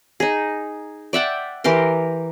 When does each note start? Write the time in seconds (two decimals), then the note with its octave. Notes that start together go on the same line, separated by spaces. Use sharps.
0.20 D#4 G#4
1.13 D5 E5 F#5 G5
1.64 E3 G4 A#4 C6